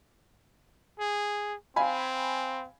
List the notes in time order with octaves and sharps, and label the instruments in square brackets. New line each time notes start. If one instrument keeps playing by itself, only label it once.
[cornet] G#4
[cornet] C4 [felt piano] F5 G#5 B5